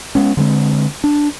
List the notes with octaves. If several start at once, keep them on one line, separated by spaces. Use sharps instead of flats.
G#3 B3 C#4
D3 G3 G#3 C4
D4